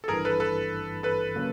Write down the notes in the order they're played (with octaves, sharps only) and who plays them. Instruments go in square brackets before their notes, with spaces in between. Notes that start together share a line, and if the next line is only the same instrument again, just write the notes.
[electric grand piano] A4
[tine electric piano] G#1 G2 E3 [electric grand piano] G#4 A#4
[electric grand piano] A4 B4
A4 B4
A4 B4
[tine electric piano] C#3 F#3 A#3